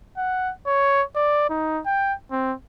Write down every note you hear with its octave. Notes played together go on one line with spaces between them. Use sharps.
F#5
C#5
D5
D#4
G5
C4